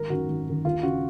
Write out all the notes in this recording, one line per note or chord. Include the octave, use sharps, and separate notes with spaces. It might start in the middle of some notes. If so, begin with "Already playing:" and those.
Already playing: G#1 A#4
F#2 D#3 F#4
G#1
F#2 D#3
D#2 F4
C#3 F#4